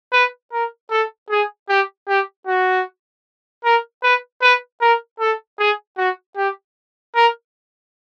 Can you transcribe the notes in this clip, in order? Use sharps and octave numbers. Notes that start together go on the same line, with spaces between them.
B4
A#4
A4
G#4
G4
G4
F#4
A#4
B4
B4
A#4
A4
G#4
F#4
G4
A#4